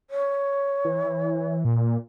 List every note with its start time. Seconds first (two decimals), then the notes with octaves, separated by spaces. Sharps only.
0.10 C#5
0.85 E3
1.65 A#2